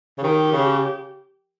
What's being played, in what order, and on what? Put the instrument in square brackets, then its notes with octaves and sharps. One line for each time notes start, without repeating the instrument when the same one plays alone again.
[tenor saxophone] C#3
[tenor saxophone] D#3 [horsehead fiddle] G4
[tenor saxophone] C#3